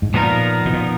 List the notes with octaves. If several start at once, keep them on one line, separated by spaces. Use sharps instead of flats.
G#2
A#2 F3 B3 D#4 A#4
B2
A#2